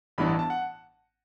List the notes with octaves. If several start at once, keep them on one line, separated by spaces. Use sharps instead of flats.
A1 G2 E3 B3 D4 B5
A5
A5
F#5